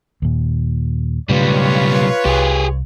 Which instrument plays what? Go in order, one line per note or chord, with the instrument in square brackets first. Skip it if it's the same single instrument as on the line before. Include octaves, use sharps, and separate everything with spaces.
[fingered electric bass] D#2 A#2
[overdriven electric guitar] B1 G3 [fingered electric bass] G#2 C#3 A3 [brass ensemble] F4 B4 C#5
[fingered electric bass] C2 [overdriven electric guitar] G4 G#4